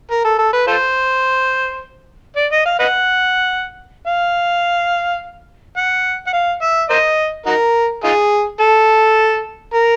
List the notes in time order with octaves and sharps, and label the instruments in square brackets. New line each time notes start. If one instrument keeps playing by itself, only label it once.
[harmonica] A#4
A4
A4
B4
F4 A4 C5
D5
D#5
F5
B4 D#5 F#5
F5
F#5
F#5
F5
E5
A#4 C5 D#5
D#4 F#4 A#4
D#4 F4 G#4
A4
A#4